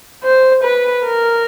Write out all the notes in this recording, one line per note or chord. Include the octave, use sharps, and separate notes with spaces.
C5
B4
A#4